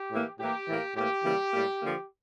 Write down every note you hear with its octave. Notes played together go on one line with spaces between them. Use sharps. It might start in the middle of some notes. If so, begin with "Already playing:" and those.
Already playing: G4
A2 E3 A#3
A2 E3 A#3 G4
A2 E3 A#3
A2 E3 A#3 G4
C#3 E3 G3 A#3
A2 G3 A#3
D3 F3 A#3